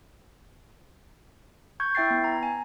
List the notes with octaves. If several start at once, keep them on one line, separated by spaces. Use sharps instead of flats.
C#6 G6 G#6
E4 E5 G5 G#6 A6 C7
B3
A#5
G#5